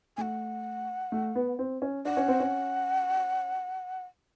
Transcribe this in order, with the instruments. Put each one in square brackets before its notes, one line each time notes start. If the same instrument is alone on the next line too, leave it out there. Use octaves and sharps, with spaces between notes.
[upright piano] A3 [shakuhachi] F#5 G#5
[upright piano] A3
B3
C4
C#4
[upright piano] D4 [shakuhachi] F#5
[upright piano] C#4
C4
C#4